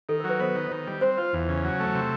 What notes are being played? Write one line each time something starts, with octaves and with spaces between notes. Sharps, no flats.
D#3 A4
F#3 A#4
B4
B3 C5
D#3
D#3
G3
C4 C5
F4
E2
C#3
F#3
A3
C3